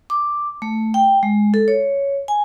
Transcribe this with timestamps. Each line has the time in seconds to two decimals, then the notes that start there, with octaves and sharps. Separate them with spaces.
0.10 D6
0.62 A3
0.94 G5
1.23 G#3
1.54 A4
1.68 C#5
2.28 G#5